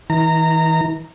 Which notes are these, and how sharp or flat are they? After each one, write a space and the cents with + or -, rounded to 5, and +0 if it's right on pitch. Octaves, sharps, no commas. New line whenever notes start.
E3 -40 A#5 -20